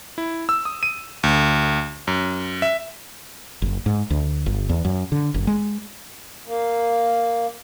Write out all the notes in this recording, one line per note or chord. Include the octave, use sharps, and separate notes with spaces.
E4
E6
D#6
D#7
D2
F#2
E5
F#1
G#2
D2
G1
E2
F#2
D3
F#1
G#3
A#3